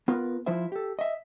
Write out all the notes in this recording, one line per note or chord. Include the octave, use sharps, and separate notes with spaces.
B3 F4 A#4 B4
F3 E4 F4 C5 E5
G4 A4
D#5 E5